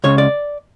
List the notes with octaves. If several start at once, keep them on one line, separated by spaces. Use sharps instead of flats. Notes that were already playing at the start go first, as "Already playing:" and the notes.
C#2 C#3 C#5
D5